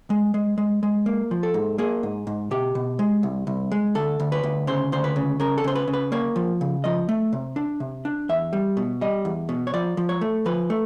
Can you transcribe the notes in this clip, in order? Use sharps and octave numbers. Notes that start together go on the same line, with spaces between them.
G#3
G#3
G#3
G#3
A#3
F3
A4
G#2
A#3 G#4
G#2
G#2
B2 G4
B2
G#3
C2
C2
G#3
D2 A4
D2
B4
D2
C#3 C5
D2 C5
B4
C#3
C#3 A#4
A4
C#3 C5
B4
C#3
B4
A#3 C#5
F3
C#3
F3 D#5
A3
C3
D4
C3
D4
E2 E5
G3
B2
G3 D#5
E2
B2
C#5
F3 D5
F3
C#5
A3
F3 B4
A3